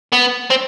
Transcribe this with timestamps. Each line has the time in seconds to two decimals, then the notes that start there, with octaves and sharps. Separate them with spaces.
0.12 B3
0.50 C4